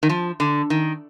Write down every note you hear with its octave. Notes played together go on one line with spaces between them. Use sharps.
D#3
F3
D3
D#3